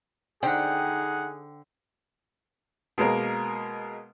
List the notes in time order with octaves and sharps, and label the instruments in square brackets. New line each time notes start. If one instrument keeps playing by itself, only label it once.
[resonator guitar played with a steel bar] D3 C5 G5 [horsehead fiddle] D#4 F#5 [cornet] G#4
[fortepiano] B2 G#3 A#3 A#4